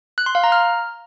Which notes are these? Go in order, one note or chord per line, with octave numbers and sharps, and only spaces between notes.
F#6
C6
F5
A#5
F6